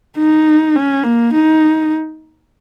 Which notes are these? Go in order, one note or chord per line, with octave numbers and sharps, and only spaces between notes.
D#4
C#4
A#3
D#4